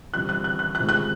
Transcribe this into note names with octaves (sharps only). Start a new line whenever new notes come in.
C3 E3 G3 F#6
F#6
F#6
F#6
F#6
C3 D#3 G#3
F#6